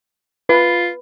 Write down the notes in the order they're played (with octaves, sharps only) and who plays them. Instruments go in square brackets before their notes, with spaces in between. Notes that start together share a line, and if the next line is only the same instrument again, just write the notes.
[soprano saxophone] F4 [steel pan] B4